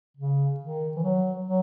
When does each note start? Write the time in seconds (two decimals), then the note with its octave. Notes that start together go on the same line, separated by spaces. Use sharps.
0.17 C#3
0.60 D#3
0.96 E3
1.03 F#3
1.45 F#3